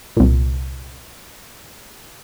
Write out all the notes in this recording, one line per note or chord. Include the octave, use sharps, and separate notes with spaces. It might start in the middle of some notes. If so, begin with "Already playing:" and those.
C2 A#2